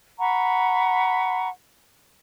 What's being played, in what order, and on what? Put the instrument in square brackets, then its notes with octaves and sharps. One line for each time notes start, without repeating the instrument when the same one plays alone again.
[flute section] F#5 A#5 B5 C#6